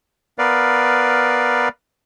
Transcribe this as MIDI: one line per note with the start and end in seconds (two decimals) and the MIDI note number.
0.38 1.69 59
0.38 1.69 70
0.38 1.69 71
0.38 1.69 74
0.38 1.69 77